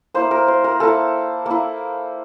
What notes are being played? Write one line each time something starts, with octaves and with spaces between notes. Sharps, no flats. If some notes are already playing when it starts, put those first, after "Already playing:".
A#3 E4 C5
A#4
C5
A#4
A#3 E4 A4
A#3 E4